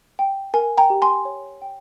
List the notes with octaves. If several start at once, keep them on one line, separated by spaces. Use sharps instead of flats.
G5
A#4 G#5
G5 A#5
G4
G#5 C6
C#5
G5